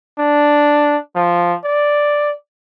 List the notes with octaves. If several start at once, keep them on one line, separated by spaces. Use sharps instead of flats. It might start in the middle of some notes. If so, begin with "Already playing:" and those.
D4
F3
D5